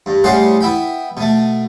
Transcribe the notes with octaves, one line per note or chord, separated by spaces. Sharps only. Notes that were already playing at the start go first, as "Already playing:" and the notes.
G2
A2 G3 C#4 G#4 C5 F#5
B3 E4 G5 B5
B2 A3